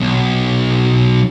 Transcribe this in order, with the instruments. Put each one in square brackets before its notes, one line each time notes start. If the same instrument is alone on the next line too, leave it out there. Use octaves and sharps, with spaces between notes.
[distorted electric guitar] B1